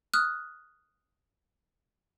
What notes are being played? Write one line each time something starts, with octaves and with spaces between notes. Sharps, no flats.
D#6 F6 F#6